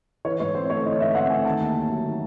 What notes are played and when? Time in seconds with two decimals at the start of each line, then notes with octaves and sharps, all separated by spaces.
0.25 E3 C#5
0.40 G#2 C#5
0.55 C4 C5
0.70 A3 C#5
0.85 E3 D#5
1.00 G#2 E5
1.15 C4 F#5
1.30 A3 G#5
1.45 D#3 A5
1.60 D#2
1.75 D#2
1.90 F#3
2.06 D#3